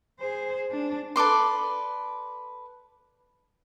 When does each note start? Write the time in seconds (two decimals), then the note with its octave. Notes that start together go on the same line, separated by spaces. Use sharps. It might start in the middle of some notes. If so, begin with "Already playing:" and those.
0.20 G#4 C5
0.71 D4
1.16 A4 B4 D5 C6